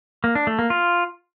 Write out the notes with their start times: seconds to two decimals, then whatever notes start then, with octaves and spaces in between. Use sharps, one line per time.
0.24 A#3
0.35 D4
0.47 A3
0.59 A#3
0.70 F4